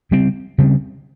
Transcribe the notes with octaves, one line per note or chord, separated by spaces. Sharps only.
C#3 G3 C4
C#3 G3 C4